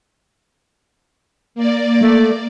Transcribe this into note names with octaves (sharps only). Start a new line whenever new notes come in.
A#3 D5
A3